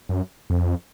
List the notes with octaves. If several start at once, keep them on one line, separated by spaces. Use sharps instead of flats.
F#2
F2